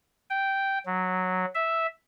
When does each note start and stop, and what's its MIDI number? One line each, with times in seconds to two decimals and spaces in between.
0.30 0.78 79
0.86 1.45 54
1.55 1.87 76